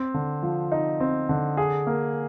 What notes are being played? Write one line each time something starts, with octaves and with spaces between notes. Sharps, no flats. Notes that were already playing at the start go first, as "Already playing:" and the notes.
Already playing: C4
D3
F3
D#4
C4
D3
G#4
A#3